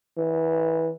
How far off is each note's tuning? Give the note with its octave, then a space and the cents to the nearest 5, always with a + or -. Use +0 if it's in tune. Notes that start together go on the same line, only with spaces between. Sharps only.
E3 -20